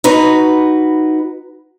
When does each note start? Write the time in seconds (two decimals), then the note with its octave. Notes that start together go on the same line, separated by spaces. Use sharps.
0.04 D#4 F#4 B4